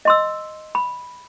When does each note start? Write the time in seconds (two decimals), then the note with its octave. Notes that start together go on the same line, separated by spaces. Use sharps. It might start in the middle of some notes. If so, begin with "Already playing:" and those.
0.05 D#5 C6 E6
0.75 B5